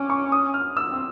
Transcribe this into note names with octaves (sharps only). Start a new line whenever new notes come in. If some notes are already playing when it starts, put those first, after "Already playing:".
Already playing: C#4 D6
C#6
D#6
F6
E6
C4